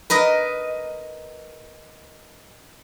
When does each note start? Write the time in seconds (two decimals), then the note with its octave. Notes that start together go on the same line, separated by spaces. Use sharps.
0.10 A#4 B4 D#5